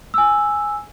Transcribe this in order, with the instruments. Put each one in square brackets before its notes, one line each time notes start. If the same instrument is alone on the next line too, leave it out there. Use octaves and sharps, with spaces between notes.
[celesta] G#5 E6